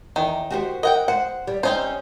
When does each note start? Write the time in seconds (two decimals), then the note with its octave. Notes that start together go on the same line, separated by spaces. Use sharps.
0.16 E2 D#3
0.50 F#4 G4 C5
0.83 A#4 D#5 F#5 G5
1.08 C5 F#5
1.47 G3
1.63 C4 C#4 D#4 C5